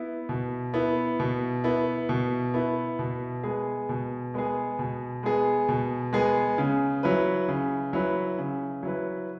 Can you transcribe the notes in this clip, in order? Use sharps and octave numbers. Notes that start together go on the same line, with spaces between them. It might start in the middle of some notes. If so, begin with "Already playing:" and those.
Already playing: B3 E4
B2
B3 E4
B2
B3 E4
B2
B3 E4
B2
G#3 B3 G#4
B2
G#3 B3 G#4
B2
G#3 B3 G#4
B2
G#3 B3 G#4
C#3
F#3 E4 B4
C#3
F#3 E4 B4
C#3
F#3 E4 B4